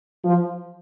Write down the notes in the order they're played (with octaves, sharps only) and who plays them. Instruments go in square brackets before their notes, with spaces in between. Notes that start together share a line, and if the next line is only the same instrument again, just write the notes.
[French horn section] F3